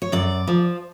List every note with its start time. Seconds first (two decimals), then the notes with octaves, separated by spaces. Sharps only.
0.02 C#5
0.12 F#2 D5
0.47 F3